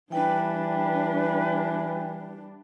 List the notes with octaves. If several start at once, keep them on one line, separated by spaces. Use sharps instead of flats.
E3 G3 D4 B4 G5